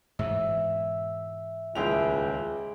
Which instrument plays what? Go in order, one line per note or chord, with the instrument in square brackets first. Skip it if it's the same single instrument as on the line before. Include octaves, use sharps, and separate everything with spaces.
[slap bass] G#2 B2 E3 [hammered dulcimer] E5
[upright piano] D#1 E4 F7 [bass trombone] C#2 [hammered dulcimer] G#3 G5